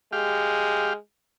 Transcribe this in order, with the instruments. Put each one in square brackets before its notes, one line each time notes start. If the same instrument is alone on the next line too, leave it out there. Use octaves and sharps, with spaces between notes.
[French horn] G#3 [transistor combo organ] G4 F5